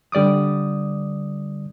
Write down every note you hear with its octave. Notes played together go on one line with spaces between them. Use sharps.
D3 G3 D5 D6 D#6